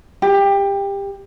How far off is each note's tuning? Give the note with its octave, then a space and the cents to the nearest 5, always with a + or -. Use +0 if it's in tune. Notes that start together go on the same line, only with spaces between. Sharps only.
G4 +20